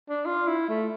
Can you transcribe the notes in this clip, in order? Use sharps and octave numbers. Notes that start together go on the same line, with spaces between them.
D4
F4
E4
A3